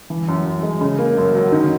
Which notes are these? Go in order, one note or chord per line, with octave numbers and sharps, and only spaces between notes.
E3
F#2
F#2
G#3
C#3
A#3
F#2
F#3
D#3